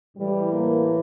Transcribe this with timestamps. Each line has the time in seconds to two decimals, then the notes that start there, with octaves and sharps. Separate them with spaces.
0.16 A2 E3 G3
0.52 A#3